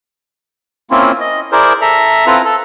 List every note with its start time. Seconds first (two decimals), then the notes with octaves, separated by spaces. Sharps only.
0.91 A#3 C4 C#4 E4 F4
1.20 D#5
1.52 E4 G#4 A#4 C5 D5
1.81 A4 E5 A#5
2.27 C4 E4 F4 A4 B4 A#5
2.45 A4